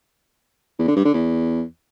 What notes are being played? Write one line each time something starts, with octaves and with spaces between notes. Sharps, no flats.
E2
D3
G2
D3
E2